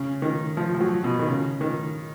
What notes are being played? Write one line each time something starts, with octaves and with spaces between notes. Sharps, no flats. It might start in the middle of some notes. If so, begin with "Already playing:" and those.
Already playing: C#3
D#3
F3
F3
F#3
B2
D#3
C#3
D#3